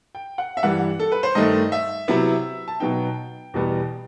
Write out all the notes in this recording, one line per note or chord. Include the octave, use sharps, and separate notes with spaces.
G5
F#5
E5
G2 E3 G3 F#5
A4
B4
C5
G2 D#3 A3 D#5
E5
C3 F#3 B3 E4
A5
B2 F#3 B3 D#4 G5
E2 B2 G3 B3